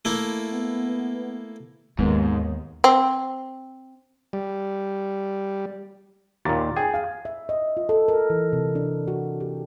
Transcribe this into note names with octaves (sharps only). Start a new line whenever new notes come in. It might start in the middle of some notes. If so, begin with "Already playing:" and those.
A3 A#3 E4
B3
D#2 G#2 D#3 G#3 B3 A#4
C4
G3
D#2 A#2 A#5 D6 A6
G#4 G5 G#5
F5
E5
D#5
F4
A4
A#4
E3
C3
D4
F#4
G4